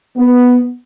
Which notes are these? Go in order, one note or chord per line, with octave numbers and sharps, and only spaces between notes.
B3